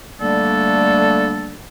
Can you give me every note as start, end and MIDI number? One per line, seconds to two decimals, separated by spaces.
0.20 1.60 50
0.20 1.60 55
0.20 1.60 57
0.20 1.60 58
0.20 1.60 62
0.20 1.60 69